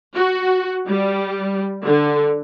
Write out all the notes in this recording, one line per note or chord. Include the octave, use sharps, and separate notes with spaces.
F#4
G3
D3